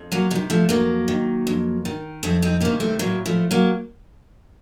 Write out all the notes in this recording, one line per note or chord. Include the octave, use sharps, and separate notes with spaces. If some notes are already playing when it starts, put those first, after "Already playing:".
Already playing: F2
F#3 A#3
C3 D#3 F#3
F3 A3
F2 F#3 A#3
D#3
F2
D#3
F2 A3 C4
C4 D#4
C3 D#3 A#3 C#4
A3 C4
A2 F#3 A#3
F3 A3
F#3 A#3